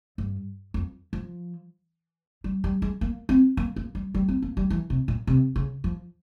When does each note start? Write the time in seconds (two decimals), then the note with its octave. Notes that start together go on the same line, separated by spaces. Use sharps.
0.18 G2
0.74 F2
1.13 F3
2.44 G3
2.64 G3
2.82 G#3
3.01 A#3
3.29 C4
3.57 A#3
3.76 A#3
3.95 G3
4.14 G3
4.28 C4
4.42 A#3
4.57 G3
4.70 E3
4.90 C3
5.08 A#2
5.27 C3
5.56 C#3
5.84 F3